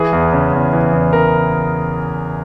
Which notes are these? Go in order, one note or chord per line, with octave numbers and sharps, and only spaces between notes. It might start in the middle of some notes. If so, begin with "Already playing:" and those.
Already playing: E3 G#4
E2
C#3
E2
E3
E2
C#3 A#4